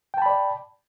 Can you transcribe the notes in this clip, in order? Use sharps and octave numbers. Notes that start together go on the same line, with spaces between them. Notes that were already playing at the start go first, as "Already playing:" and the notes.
D5 G5 A5 B5